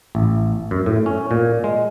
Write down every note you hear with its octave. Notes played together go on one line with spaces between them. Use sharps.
A1
F#2
A2
C#4
A#2
G#3